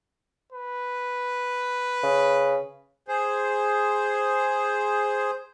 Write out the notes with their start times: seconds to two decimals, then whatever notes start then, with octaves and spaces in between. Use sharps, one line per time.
0.52 B4
2.03 C#3
3.08 G#4 C5